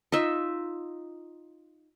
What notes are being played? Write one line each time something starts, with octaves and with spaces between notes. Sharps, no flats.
D#4 F4 E5